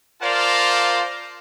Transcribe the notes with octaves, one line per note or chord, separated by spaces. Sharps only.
F4 A#4 C5 D5 F5 A5